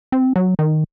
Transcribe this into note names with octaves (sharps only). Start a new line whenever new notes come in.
C4
F#3
D#3